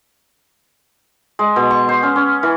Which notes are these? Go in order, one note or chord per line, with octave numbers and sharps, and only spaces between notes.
G#3
B2
C#6
C5
C#4
C#4
E3